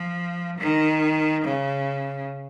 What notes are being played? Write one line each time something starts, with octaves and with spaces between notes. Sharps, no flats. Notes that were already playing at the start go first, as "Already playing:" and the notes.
Already playing: F3
D#3
C#3